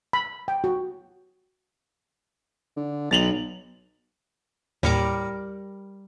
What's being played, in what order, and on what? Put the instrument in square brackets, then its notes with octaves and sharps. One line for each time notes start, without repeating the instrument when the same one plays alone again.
[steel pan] B5
G5
F#4
[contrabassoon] D3
[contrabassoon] B1 [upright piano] A6 F7 F#7
[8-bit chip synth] D#2 A2 C#7 [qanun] G3 A#4 D6